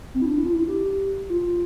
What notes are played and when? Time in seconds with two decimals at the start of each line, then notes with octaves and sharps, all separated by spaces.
0.14 C4
0.22 E4
0.26 D4
0.37 E4
0.46 F4
0.53 E4
0.68 G4
1.29 F4